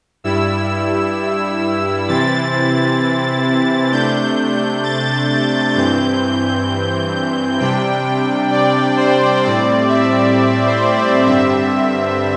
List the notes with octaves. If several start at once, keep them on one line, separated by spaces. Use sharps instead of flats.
G2 G3 E4 E6
C3 E3 C4 E4 A6
C3 A3 D4 G6
G6
G6
A6
G2 E3 C4 G6
C3 G3 D4 G5
D5
C5
A2 G3 C4 D5
E5
C5
D5
G2 D3 G3 C4 E5